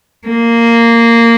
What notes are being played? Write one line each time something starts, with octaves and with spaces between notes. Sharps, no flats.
A#3